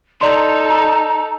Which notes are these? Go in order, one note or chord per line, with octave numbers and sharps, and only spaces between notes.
D#4 A4 D5 A#5 C6